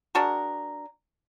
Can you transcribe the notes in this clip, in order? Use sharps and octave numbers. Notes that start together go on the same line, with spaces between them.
D4 F#4 G#4 A#4